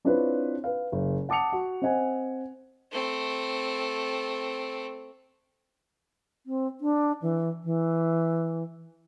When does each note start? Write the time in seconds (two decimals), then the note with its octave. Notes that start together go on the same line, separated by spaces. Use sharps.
0.05 C4 D4 E4 F4 B4 C#5
0.64 B4 F5
0.92 F#1
1.29 F#5 A5 D6 D#6 C#7 F7
1.52 F#4
1.82 C4 C5 D#5 F#5 G#5
2.92 A3 C4
6.46 C4
6.81 D4
7.22 E3
7.64 E3